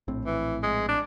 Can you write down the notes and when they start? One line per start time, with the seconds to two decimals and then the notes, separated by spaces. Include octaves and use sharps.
0.08 A#1 A2 C4
0.25 E3
0.63 G#3
0.89 D4